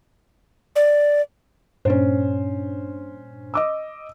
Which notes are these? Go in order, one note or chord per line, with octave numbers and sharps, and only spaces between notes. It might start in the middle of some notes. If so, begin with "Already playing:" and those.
D5
G2 A#2 C#4 D4 C5
D#5 D6 E6